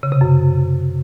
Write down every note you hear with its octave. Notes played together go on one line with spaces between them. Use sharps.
C#3
C3
F#2